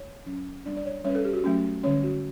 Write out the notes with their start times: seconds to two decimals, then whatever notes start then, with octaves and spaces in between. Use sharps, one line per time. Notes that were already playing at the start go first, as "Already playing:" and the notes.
Already playing: C#5
0.26 F#3 C#4
0.65 G3 B3 D4 D5
0.77 D5
0.85 C#5
1.05 G3 C#4 B4 C#5
1.15 A4
1.25 G4
1.34 F#4
1.44 F#3 A3 C#4
1.83 D3 G3 C#4 C#5
2.03 F#4